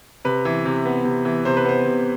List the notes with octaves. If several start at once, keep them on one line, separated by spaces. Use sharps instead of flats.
C3 B4
E3
C3
B3
C3
E3
C3 C5
B4
B3 C5
C3